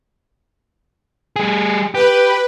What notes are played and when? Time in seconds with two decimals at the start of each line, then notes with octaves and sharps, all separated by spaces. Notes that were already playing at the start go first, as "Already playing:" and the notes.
1.36 G3 G#4
1.95 G4 B4